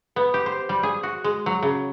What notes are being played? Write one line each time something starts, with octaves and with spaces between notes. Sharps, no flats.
B3
G4
C5
G3
G#4
F#4
G#3
F#3
C#3